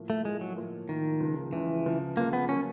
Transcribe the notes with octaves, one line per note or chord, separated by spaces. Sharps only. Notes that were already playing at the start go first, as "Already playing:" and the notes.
Already playing: A2 F3 A#3
A3
A2 F3 G#3 A#3
F#3
A2 F3 A#3
A2 D#3 F3 A#3
C#2 C#3 F3
C#2 C#3 E3 F3
C#2 C#3 F3
C#2 C#3 F3 A#3
B3
C#3 F#3 A#3 C#4